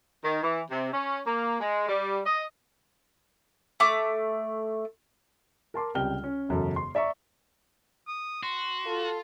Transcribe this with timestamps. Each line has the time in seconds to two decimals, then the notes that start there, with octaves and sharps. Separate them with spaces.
0.23 D#3
0.42 E3
0.70 C3
0.92 C#4
1.25 A#3
1.60 G#3
1.88 G3
2.25 D#5
3.80 A3 D6
5.74 A#4 A5 C6 D6
5.95 C#2 C3 G3 G5 F6 G7
6.24 C#4
6.49 E1 F#2 C#3 A4
6.76 C6
6.95 D5 E5 A#5 C#6
8.08 D#6
8.43 F#4 C6
8.86 F4 A4